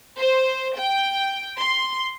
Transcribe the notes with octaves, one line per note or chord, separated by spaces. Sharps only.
C5
G5
C6